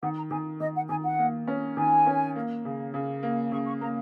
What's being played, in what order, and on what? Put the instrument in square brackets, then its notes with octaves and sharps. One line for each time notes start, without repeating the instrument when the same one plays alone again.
[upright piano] D#3 [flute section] F#5
[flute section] A#5
[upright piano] D#3 [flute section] G#5
[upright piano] D#3 [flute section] D#5
[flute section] F#5
[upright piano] D#3 [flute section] G#5
[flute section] F#5
[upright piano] A#3
C#4
[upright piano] D#3 [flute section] G#5
[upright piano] C#4
A#3
C#3
C#3
A#3
[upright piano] C#3 [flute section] C#6
[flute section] C#6
[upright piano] A#3 [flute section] A#5